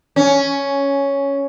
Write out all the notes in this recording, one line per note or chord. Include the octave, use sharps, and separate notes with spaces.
C#4